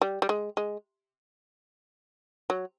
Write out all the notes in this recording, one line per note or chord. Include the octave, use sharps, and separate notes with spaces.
G3
G3
G#3
G#3
F#3